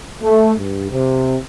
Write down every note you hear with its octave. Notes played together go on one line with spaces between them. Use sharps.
A3
G2
C3